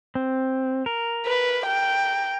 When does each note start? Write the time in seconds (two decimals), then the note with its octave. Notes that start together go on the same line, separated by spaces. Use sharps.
0.15 C4
0.86 A#4
1.26 B4
1.67 G5